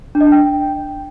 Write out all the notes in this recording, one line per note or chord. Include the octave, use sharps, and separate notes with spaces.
D4
D#5
D4
G5